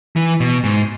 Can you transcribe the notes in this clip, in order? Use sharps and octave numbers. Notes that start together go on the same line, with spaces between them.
E3
B2
G#2